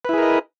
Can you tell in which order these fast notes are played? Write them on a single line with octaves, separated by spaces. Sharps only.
B4 E4 G#4 A#4 D#5